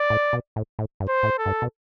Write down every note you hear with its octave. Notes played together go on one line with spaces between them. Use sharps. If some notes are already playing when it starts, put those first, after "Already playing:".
Already playing: D5
A2
B2
A2
A2
G2
C5
A2
A4
G2
B2